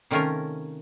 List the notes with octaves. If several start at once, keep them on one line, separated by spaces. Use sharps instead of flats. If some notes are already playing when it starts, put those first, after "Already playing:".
C3 D#3 A3 C#4 F4 A#4